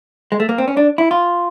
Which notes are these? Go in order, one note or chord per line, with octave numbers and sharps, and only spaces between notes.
G#3
A3
A#3
C4
C#4
D4
E4
F4